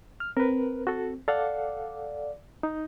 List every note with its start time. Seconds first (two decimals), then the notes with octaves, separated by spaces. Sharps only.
0.20 F6
0.37 C4 A#4 B4
0.87 F#4 A4
1.28 A4 D5 F5 F#5
2.63 D#4